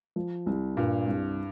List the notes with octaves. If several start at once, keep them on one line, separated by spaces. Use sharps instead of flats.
F3
C2
G2 A#2
C2